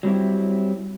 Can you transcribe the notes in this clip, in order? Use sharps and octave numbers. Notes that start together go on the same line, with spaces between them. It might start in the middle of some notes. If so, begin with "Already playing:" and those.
F#3 G3 C4 E4